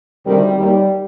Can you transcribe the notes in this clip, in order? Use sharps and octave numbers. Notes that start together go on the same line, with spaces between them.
D2 C3 D#3 G3
D#2 D#3 G3